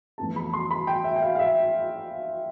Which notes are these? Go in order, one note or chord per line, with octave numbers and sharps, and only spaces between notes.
G1 F2 E3 A3 A5
B5
C6
B5
G5
E5
G5
F5
F5
E5